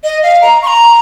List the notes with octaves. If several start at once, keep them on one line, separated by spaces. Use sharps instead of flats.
D#5
F5
A#5
C#6
A#5